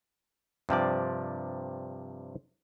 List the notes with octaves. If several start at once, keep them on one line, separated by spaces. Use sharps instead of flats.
G2 C3 F3 D5